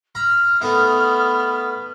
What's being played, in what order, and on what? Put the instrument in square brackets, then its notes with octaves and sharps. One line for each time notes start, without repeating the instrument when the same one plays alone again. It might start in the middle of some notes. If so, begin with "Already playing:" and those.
[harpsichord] A#5 B5 [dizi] F6
[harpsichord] A3 D#4 [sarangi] B3